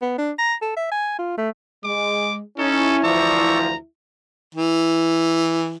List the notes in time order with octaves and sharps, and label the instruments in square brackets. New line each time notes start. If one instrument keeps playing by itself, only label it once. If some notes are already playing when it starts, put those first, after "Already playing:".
[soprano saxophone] B3
D4
A#5
A4
E5
G#5
F4
A3
[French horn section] G#3 [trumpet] D6
[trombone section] C#4 [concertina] D#4 [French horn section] E4 [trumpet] A4
[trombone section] D2 E3 F3 [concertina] D5 C#6 E6 [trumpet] A#5
[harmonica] E3